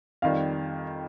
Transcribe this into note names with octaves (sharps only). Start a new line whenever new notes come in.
F2 D#3 G3 F5